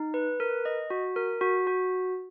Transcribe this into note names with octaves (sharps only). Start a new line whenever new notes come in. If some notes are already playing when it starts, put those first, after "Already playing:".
Already playing: D#4
B4
A#4
D#5
F#4
A#4
F#4
F#4